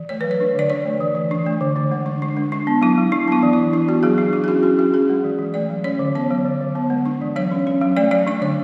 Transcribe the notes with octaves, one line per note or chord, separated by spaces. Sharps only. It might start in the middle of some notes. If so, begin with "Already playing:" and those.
Already playing: E3
A3 C#5
F#3 B4
C#5
D4
D3 D5
D4 C#5
A3
E3
E3
D4
A3
D3
D3
G#3
D4
D4
G#3
D4
B3
F#3 E4
F#3
D4
B3 E4
E3
E3 E4
D4
B3 F#4
F#3 G#4
F#3 D4
F#3 E4
G#4
C#4 F#4
C#4 F#4
F#3 F#4
C#4 G#4
G#3
E3
E3
A3 D5
F#3
C#4 C#5
D3
B3 C#5
F#3
D3
D3
B3
G#3
D4
E3
F#3 C#5
C#4
C#4
F#3
A3 D5
F#3 D5
D4 D5
D3 C#5